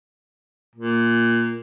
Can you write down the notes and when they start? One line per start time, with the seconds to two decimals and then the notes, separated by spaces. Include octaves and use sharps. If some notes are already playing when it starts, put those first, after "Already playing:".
0.76 A#2